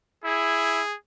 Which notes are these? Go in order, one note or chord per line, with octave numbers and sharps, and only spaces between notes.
E4 G#4